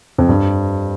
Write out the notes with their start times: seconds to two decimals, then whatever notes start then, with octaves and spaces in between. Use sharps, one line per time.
0.18 F2
0.29 G2